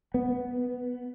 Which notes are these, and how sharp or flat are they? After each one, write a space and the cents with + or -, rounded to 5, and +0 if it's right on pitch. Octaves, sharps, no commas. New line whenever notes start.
B3 +0